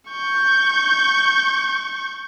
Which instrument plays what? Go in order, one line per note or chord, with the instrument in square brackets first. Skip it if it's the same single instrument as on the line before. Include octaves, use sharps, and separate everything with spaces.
[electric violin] C#6 G6